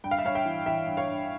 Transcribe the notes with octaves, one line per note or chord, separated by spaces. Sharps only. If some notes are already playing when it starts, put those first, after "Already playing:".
G2 G5
F5
E5
G2 C#5 F5
E5 G5
E3
E3 E5 G5
G2
C#5 F5
G2